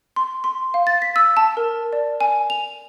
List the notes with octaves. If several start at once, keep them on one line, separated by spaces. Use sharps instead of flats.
C6
C6
F5
A6
B6
E6
A5
A#4
D5
G#5
F7